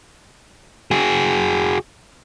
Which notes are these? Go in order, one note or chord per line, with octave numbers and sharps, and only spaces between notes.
F#4 G#4